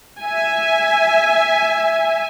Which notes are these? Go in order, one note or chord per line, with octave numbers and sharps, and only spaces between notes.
E5 G#5